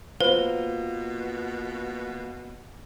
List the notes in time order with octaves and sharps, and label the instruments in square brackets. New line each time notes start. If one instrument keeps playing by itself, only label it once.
[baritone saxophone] B2 [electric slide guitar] A#3 F4 [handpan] B4 [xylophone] C5